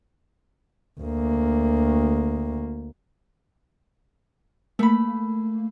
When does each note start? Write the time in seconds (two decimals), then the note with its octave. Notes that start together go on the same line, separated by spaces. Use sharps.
1.01 D2 A#3
4.79 A3 A#3 B5